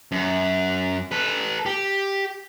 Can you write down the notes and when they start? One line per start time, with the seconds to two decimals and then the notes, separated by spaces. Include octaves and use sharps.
0.12 F#2
1.12 A4 B4
1.66 G4